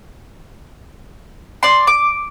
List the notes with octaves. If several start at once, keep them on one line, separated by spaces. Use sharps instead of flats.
D5 C6
D6